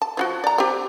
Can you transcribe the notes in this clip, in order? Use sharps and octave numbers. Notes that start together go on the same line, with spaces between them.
A5
F3 F4 F#4
D5 A#5
C4 G4